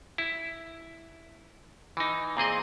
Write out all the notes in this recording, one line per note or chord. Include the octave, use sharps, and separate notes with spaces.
E4
E3 D#4
A#2 C4 G#4 D#5